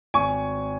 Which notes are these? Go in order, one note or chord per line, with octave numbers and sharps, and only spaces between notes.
G#1 G#5 C#6